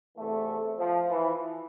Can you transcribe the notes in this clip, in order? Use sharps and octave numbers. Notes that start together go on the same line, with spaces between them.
E2 C3 E3 A3
F3
E3